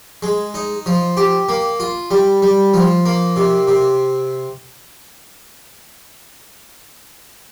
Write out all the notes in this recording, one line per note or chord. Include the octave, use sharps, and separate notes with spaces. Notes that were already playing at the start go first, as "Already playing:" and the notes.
G#3
D#4
F3
G4
A#3
F4
G3
G3
F3
A#3
C3
C3